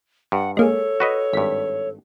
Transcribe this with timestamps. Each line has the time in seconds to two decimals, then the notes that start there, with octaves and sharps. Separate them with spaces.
0.32 G2 F#5
0.57 G#3 A#3 G#4 A4 C#5
1.00 F#4 B4 D#5
1.33 G#1 G2 B6